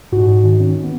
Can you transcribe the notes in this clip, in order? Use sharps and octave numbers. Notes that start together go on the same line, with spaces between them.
G#2 F#4
G#2
D#3
D#3 C#4
B3